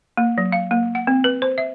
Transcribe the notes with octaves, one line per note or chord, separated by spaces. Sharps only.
A#3
F#3
F5
A#3
F#5
C4
B4
C5
E5